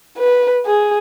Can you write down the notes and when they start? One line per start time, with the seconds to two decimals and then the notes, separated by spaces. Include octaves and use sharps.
0.18 B4
0.66 G#4